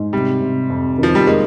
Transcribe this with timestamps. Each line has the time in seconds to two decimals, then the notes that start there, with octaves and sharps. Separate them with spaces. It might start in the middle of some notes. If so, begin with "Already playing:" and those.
Already playing: G#2
0.13 C3 G3
0.41 C3
0.70 F2
0.98 D#3 F3
1.15 G3
1.27 G#3 A#3